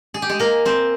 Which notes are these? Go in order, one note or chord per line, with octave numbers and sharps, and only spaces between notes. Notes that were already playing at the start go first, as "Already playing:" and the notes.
G#4
G4
G#3 G#4
A#3 A#4
C4 C5